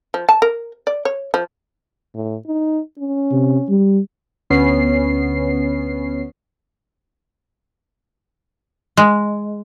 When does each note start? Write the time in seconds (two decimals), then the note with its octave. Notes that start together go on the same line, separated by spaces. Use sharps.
0.14 F3
0.29 A5
0.42 A#4
0.87 D5
1.05 C#5
1.34 F3
2.15 A2
2.47 D#4
2.98 C#4
3.32 C3
3.69 G3
4.50 D2 B3 C#4 C7
8.97 G#3